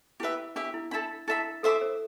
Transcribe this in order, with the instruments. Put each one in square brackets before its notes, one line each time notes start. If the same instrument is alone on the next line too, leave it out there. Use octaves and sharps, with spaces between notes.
[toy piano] E4 [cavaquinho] G4 B4 E5
[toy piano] D4 [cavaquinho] G4 B4 E5
[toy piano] E4
[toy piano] D4 [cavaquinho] A4 E5 B5
[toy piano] E4 [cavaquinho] A4 E5 B5
[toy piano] A4 [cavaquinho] C5 E5 B5 D6
[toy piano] C5